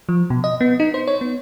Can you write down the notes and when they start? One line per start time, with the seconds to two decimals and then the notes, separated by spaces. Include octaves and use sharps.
0.09 F3
0.30 B2
0.44 D#5
0.61 B3
0.80 D#4
0.94 C5
1.07 C#5
1.21 B3